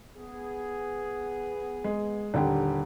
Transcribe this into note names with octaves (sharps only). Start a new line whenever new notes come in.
B3 G#4
G#3
D#1 D3 G4